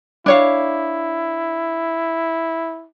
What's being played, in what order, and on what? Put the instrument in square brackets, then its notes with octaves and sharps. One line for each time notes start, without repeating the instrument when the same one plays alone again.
[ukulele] D4 C#5 F5 [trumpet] E4